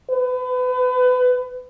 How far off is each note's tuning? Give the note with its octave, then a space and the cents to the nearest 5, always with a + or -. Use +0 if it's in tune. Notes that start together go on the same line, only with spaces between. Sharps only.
B4 +30